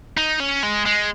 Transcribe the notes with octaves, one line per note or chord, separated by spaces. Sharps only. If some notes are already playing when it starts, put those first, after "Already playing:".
D#4
C#4
G#3
G#3